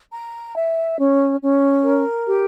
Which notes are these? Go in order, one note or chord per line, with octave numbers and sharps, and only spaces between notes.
A#5
E5
C#4
C#4
A#4
G4